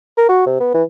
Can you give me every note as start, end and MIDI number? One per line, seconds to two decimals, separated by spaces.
0.18 0.27 70
0.29 0.42 66
0.47 0.56 48
0.60 0.70 59
0.75 0.83 52